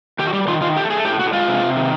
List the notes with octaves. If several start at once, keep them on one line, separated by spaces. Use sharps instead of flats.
D#3 G4
F#4
G3 G4
D#3 F4
D#3 F4
A3 G4
A3 G#4
A2 G4
A2 F#4
G#3 F4
C3
C3
D#3